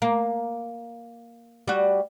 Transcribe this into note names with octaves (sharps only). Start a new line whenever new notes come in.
A#3
G3 F#4